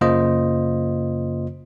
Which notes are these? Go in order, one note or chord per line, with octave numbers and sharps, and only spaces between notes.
F#2 C#3 A#3 F4 C5 D#5